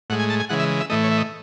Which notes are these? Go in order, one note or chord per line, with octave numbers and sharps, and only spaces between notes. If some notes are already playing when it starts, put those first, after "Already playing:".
A2 G#3 F#5
G#5
A5
G#5
C#3 E3 G#3 F#5
E5
E5
A2 E3 A3 D#5
C#5
E5
D#5